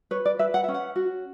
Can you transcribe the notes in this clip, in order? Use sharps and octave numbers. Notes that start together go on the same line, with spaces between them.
B4 C#5
D5
B4 E5
F#5
C#4 E5
F#5
F#4